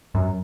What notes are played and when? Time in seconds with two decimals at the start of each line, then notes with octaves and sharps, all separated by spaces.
0.15 F#2